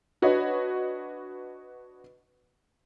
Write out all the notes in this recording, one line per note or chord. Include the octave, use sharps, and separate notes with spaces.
D4 F#4 B4 C#5 D#5